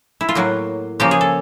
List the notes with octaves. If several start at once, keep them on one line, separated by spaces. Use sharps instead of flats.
E4
F4
A2 F#3 A#3 F#4
C#3 F3 A#3 G4
G#4
A4